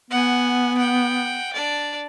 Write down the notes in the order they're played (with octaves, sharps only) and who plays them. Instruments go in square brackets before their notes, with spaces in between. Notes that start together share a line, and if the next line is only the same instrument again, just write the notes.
[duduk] B3 [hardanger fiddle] F#5 G#5
[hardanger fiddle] F#5 G5
D4 D5